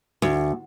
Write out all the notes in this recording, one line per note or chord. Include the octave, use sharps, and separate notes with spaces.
D2